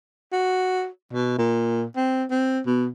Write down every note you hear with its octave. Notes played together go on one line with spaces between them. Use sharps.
F#4
B2
A#2
C4
C4
B2